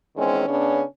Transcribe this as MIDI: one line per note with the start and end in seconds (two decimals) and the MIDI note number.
0.16 0.46 40
0.16 0.46 51
0.16 0.46 56
0.16 0.46 60
0.16 0.46 61
0.47 0.83 49
0.47 0.83 59
0.47 0.83 61
0.47 0.83 62